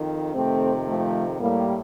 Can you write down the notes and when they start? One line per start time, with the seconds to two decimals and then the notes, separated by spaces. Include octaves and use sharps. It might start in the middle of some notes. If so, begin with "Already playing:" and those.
Already playing: F2 D#3
0.33 F2 C3 D#3 A3 C4
0.87 F3 A3
1.39 A2 G3 A#3